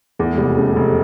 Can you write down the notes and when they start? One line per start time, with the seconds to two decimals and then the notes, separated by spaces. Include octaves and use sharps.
0.19 E2 A3
0.33 G#3
0.38 F1 G3
0.57 C#3 A3
0.76 F1 A3